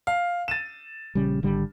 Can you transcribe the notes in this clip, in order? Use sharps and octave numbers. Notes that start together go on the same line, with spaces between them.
F5
A6 D#7 E7
A#1 C#3 G3
G#1 D3 G3